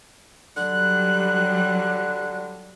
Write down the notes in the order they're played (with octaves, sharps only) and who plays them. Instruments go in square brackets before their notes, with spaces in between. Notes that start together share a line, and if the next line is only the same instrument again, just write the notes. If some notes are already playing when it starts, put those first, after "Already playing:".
[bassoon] D3 [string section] F#3 G3 [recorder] F#6